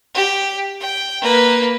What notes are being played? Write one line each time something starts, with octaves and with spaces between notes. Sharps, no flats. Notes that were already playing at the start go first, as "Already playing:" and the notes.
G4
G5
A#3 B4